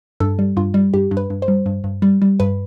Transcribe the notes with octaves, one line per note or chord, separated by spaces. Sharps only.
G2 A4
G3
G2 F4
G3
G2 G4
G2
B4
G2
C5
G3
G2
G2
G3
G3
G2 B4